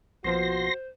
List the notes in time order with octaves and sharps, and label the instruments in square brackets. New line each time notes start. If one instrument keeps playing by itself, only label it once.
[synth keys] A#1 B2 F3 [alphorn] F#4 [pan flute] C5 [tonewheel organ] C6 A#6